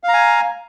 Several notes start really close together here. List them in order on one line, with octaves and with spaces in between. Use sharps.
F5 A#5 G#5